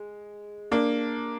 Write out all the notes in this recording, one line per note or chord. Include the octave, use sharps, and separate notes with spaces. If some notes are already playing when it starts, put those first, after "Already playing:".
Already playing: G#3
A#3 D4